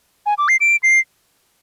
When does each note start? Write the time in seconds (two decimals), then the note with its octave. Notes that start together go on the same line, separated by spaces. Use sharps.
0.26 G#5
0.38 D6
0.48 C7
0.61 D7
0.83 C7